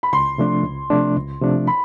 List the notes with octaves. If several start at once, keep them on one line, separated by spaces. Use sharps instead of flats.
B5
C#2 C6
C3 F3 A3 D4
C#2
C3 F3 A3 D4
C#2
C3 F3 A3 D4
B5